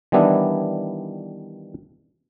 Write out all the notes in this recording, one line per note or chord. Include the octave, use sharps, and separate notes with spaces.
D#3 E3 G3 B3 D4 E4